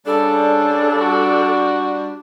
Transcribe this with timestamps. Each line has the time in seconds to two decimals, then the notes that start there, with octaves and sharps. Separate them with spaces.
0.06 C#3 G3 D4 A4
1.00 F#4